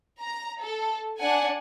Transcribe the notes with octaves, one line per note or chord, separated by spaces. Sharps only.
A#5
A4
D4 F#5 G#5